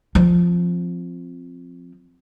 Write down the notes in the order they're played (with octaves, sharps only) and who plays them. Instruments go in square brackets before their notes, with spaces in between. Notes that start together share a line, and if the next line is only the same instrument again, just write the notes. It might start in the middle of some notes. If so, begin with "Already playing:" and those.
[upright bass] F3 C4